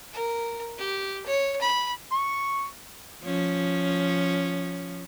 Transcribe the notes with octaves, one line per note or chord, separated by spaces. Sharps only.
A#4
G4
C#5
B5
C#6
F3 C#4